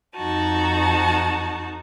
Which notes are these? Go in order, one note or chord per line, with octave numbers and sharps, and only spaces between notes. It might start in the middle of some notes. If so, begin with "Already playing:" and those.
F2 D#4 F#4 A5